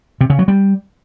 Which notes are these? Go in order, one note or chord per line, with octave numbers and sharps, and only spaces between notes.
C3
C#3
F#3
G3